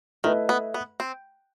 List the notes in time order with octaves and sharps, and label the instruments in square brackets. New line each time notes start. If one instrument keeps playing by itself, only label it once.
[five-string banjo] D#3 [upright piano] A3 E4 B4 D#5
[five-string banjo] B3
B3
C4